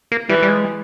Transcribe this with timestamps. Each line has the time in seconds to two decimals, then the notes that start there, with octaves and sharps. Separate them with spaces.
0.12 A#3
0.29 E3 G3
0.42 G3
0.48 G#3